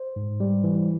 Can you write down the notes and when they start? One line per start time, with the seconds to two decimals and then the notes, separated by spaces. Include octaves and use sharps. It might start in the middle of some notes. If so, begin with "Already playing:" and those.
Already playing: C5
0.16 G#2
0.40 G3
0.64 E3